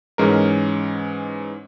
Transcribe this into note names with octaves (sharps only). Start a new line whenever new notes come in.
G#2 E3 G#3 C#4 A#4